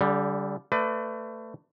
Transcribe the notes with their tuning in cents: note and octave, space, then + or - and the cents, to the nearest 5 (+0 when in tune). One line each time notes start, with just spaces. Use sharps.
D3 -35 G3 +0
A3 +25 B4 +30 D5 +25